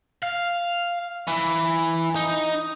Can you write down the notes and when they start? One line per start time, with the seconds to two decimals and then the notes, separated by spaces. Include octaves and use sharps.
0.23 F5
1.28 E3
2.16 D#4